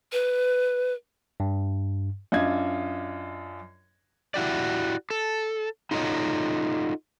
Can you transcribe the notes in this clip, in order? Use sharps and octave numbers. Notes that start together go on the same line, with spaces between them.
B4
G2
F#2 D4 F4 D#5 G#6
E4 F#4 G4 D5
A4
D#4 F4 F#4 A4 C#5 D#5